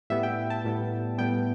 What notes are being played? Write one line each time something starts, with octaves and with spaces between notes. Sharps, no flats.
A2 G3 B3 E5
G5
A5
A2 G3 B3
A2 G3 B3 G5